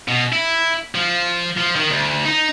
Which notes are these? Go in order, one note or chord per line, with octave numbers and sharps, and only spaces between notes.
B2
E4
F3
F3
D#3
D2
D#4